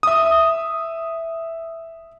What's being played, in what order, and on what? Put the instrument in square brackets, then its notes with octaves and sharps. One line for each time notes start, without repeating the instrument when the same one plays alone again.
[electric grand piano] E5 D#6